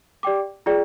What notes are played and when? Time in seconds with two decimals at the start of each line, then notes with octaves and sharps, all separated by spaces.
0.23 G4 D5 G5 D6
0.66 F4 G#4 D5 G5